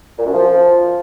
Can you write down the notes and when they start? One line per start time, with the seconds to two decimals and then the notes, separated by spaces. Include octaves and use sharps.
0.19 A#2
0.26 F#2
0.33 F3